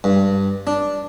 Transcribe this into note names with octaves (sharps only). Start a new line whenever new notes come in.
G2
D4